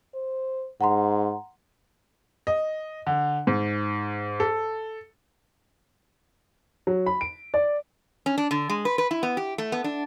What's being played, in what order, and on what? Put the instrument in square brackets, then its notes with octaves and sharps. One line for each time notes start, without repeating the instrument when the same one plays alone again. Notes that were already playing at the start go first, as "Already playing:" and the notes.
[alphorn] C5
[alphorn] G#2 [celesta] F#5 A#5 C6
[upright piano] D#5
D3
G#2
A4
F#3
B5
D7
D5
[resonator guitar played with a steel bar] C#4
D4
D3
G#3
B4
B4
E4
B3
G4
A3
B3
D4